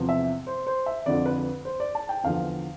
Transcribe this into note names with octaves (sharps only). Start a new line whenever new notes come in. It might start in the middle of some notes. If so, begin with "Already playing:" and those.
Already playing: E2 C3 F3
E5
C5
C5
E5
F2 D3 F3 D5
B4
C5
D5
A5
G5
E2 D3 F3 F5